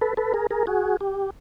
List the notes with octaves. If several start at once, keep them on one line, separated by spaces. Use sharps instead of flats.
A4 B4
A4 B4
G#4 A#4
G#4 A#4
F#4 G#4
G4